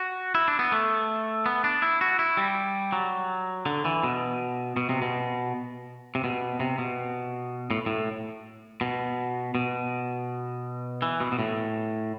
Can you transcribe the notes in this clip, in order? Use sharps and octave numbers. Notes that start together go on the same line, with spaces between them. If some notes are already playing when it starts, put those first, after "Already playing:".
Already playing: F#4
E4
D4
B3
A3
B3
D4
E4
F#4
E4
G3
F#3
D3
E3
B2
B2
C3
B2
C3
B2
C3
B2
A2
A2
B2
B2
E3
B2
B2
A2